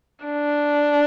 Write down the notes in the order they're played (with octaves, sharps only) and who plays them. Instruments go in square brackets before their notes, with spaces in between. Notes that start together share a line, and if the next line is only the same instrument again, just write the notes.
[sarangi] D4